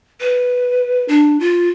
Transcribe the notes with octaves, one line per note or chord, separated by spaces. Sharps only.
B4
D4
F4